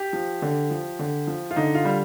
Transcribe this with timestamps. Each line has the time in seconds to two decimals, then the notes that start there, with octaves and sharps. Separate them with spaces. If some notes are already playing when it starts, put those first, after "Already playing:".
Already playing: G4
0.13 F3
0.42 D3
0.70 F3
0.99 D3
1.27 F3
1.51 F4
1.56 D3 D#4
1.75 F4
1.85 G3